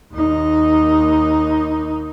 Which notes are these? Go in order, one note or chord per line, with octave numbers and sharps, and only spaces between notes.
D#2 D#4